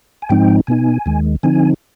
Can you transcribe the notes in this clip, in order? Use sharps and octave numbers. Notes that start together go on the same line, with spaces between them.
G#5
G#2 F3 G#3 C4 D#4 G5
B2 B3 D#4 G#5
D#2 D#3 G#3
D3 F3 C4 D#4 G#5